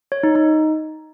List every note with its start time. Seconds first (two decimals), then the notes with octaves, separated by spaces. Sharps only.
0.12 C#5
0.23 D#4
0.35 D#4